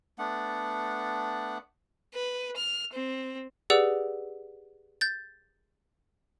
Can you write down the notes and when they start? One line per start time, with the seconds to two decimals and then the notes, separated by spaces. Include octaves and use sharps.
0.19 A3 B3 D4 F#5
2.14 B4
2.57 F6
2.93 C4
3.70 G4 G#4 B4 D5 F#5 E6
5.01 G6 A6